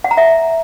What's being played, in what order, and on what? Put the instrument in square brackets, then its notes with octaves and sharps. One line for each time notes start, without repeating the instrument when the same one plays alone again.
[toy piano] F#5
A#5
E5